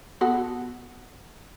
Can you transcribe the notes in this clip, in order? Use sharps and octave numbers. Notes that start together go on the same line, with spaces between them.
B3 F#4 A4